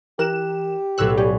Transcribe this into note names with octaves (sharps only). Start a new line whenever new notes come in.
E3 G4 A#4 F#6 E7
B1 A2 C#5 E6 F#6
G3 C#4 G4